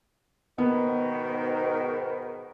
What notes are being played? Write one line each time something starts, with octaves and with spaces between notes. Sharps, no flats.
G#2 B2 D#3 B3